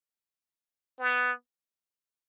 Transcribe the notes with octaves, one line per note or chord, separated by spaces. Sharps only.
B3